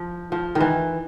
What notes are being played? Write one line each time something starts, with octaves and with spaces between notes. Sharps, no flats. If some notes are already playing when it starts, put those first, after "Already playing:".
Already playing: F3
F3
D#3
E3